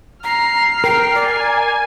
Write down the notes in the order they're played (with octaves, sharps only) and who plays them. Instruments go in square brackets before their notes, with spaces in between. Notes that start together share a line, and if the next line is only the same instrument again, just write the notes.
[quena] A#5 [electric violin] F6 C7
[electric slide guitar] A#4 [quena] G5
[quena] D5 [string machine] G#5